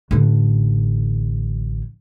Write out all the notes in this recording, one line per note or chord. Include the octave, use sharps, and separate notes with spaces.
A1 D3